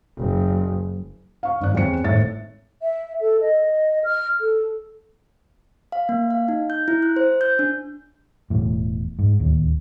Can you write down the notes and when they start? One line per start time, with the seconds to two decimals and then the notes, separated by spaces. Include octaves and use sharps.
0.17 F#1
1.43 F5 C#6
1.61 G#1 D5 F#6
1.74 E2 C4 C#5 C#7
2.04 G#1 A2 C#5 E5 A6
2.82 E5
3.21 A4
3.41 D#5
4.04 F6
4.41 A4
5.92 F5
6.09 A#3
6.30 F5
6.48 D#4
6.70 G6
6.88 E4
7.03 F#6
7.16 C5
7.41 G6
7.59 D4
8.50 E1 E2 A2
9.19 G#2
9.40 D1 D#2